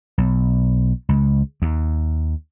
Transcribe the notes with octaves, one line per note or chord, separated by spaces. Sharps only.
B1
C#2
D#2